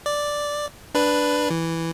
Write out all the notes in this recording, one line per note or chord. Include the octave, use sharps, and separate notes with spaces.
D5
D4 B4
E3